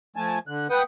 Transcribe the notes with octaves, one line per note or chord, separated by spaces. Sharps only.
F3 A3 G#5 A5
D3 F#6
B4 F#5 G5 D#6